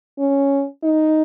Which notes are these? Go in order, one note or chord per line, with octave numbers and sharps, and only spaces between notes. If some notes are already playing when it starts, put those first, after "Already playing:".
C#4
D#4